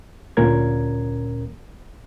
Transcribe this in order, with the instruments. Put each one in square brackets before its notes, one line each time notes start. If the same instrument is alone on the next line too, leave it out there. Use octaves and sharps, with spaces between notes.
[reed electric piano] D2 A#2 C#4 A#4 G#6